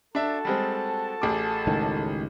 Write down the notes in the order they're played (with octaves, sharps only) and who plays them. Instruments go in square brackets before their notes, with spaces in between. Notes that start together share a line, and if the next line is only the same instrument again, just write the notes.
[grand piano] D4 E5 [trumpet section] F#4 A4 A5
[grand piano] G3 G#3 C4
A1 G#4 D6
[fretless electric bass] C#2 A2 D#3